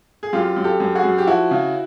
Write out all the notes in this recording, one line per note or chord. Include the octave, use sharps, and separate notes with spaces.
G#4
F#2 F4 G4
F#2
G4 A4
F#2
F#4 G#4
F#2
G4
F3 E4 F#4
C#3